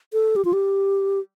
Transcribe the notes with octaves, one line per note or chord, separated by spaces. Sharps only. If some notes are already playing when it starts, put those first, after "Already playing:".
A4
G4
F4
G4